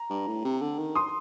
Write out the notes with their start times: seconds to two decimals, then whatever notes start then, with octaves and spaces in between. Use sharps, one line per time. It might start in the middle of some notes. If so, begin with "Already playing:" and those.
Already playing: A#5
0.10 G2
0.27 A2
0.44 C3
0.62 D3
0.78 D#3
0.95 C6 D#6